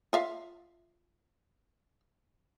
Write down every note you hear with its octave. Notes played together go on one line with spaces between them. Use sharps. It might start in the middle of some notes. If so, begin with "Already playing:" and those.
F4 E5 F5